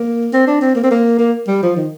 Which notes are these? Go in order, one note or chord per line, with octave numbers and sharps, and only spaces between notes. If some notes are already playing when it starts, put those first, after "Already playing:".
Already playing: A#3
C4
D4
C4
A#3
C4
A#3
A#3
G3
F3
D#3